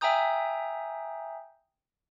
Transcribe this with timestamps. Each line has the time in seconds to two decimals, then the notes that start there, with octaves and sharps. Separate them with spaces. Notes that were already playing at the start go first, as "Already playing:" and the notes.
0.01 E5 G5 G#5 A#5 D#6 G6